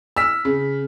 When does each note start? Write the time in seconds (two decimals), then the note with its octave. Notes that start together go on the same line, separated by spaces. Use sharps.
0.17 E6 F6 B6
0.45 C#3